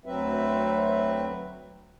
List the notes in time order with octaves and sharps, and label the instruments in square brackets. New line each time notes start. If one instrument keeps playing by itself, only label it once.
[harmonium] D2 F#3 C4 B4 E5